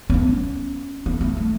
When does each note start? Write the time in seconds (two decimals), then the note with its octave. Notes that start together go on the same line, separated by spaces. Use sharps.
0.10 B3
0.14 C#4
1.06 B3
1.21 A3
1.37 A3